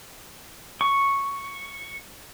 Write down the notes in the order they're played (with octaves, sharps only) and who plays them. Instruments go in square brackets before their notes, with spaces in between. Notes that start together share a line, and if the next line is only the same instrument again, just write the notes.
[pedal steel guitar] C#6